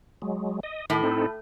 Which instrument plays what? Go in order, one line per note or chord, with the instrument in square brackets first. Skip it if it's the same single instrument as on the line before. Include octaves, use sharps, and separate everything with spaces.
[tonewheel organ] F#3 G#3
D#5
[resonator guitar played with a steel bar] A2 [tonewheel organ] D#3
[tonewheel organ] C4 D#4 A4